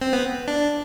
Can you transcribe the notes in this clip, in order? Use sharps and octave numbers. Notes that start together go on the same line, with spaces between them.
C4
B3
D4